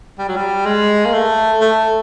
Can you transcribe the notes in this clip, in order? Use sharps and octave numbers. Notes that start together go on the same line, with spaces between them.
G3
F#3
G3
G#3
A#3
A3
A3